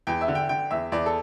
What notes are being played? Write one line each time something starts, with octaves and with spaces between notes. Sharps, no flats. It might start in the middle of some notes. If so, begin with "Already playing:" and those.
E2 G5
E5
D3
G5
D3 G5
E2 E5
E2 D5
A4